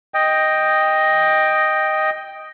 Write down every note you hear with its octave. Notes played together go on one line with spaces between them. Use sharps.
D#5 G5